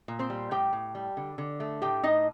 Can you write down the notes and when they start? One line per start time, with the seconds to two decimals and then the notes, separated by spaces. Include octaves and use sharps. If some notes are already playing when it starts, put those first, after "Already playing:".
0.08 A#2
0.19 C4 C5
0.30 G3
0.51 A2 G4 G5
0.73 A2
0.95 G3
1.17 D3
1.38 D3
1.60 A3
1.82 A2 G4 G5
2.03 A2 D#4 D#5